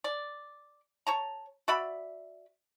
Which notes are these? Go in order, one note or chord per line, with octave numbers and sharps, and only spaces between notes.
D5
C#5 A5 A#5
F#4 D5 E5 B5